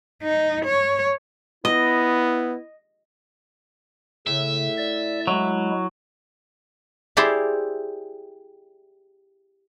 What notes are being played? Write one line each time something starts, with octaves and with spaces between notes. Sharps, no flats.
D#4
C#5
B3 E4 D#5
A2 C#3 E5
D5
F#3 G#3 E4
E4 G4 G#4 C5 D5 E5